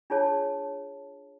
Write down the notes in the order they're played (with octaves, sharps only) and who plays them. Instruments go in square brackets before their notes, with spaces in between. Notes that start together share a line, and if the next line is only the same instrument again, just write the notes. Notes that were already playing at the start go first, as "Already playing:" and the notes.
[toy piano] D4 F4 G#4 C#5 A5